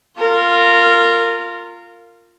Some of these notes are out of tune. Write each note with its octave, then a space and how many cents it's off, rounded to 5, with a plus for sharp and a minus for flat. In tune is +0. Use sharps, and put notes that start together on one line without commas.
F4 +0 A#4 -20